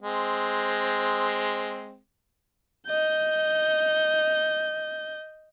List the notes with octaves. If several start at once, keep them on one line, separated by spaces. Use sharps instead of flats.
G#3 C4
D#5 G6